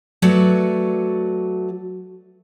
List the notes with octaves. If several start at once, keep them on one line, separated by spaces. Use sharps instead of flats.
F#3 A3 F#4 B4 D5